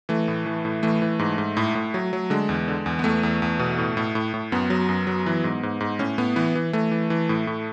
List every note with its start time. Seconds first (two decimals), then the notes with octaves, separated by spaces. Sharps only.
0.09 E3 A3
0.28 A2
0.46 E3
0.65 A2
0.83 E3 A3
1.02 E3
1.19 G#2
1.38 G#2
1.57 A2
1.75 A2
1.94 F#3
2.13 F#3
2.30 D3 G#3
2.49 E2
2.68 D3
2.86 E2
2.99 B3
3.04 E2 A3
3.23 E2
3.42 E2
3.59 B2
3.78 A2
3.97 A2
4.15 A2
4.34 A2
4.52 F#2 B3
4.70 F#3
4.89 F#2
5.07 F#3
5.26 E3
5.44 G#2
5.63 G#2
5.80 G#2
5.99 A2 C#4
6.18 A2 B3
6.36 E3 B3
6.55 E3
6.73 E3 A3
6.91 E3
7.10 E3
7.29 A2
7.47 A2